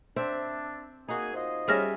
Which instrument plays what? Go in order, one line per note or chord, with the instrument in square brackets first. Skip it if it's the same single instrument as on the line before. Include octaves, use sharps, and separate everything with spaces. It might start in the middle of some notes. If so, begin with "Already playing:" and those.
[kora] C4 C5 E5 [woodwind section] D4
[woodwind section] A#3 G#4 [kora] D#4 F#4
[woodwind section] F4 C5 D#5
[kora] G3 C#4 E5 [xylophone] G#4 F6 A#6